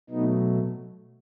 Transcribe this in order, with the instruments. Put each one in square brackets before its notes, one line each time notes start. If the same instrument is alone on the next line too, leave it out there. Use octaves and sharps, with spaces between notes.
[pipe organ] B2 F#3 A3 B3 D#4